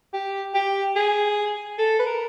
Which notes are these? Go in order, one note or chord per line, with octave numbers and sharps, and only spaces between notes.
G4
G4
G#4
A4
B4
A#4